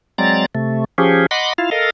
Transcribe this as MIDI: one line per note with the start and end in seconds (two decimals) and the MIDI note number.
0.18 0.46 54
0.18 0.46 56
0.18 0.46 60
0.18 0.46 74
0.18 0.46 82
0.18 0.46 93
0.55 0.84 48
0.55 0.84 57
0.98 1.26 53
0.98 1.26 61
0.98 1.26 67
0.98 1.26 68
1.31 1.53 75
1.31 1.53 78
1.31 1.53 83
1.31 1.53 84
1.31 1.53 86
1.58 1.70 64
1.58 1.70 65
1.58 1.70 77
1.71 1.90 69
1.71 1.90 70
1.71 1.90 75
1.71 1.90 77